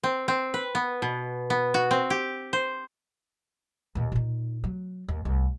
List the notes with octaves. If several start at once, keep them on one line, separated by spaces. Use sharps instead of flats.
C4
C4
B4
B3
B2
B3
F#4
C4
G4
C5
D#2 A#2
A#2 D#4
F#3
D#2
C2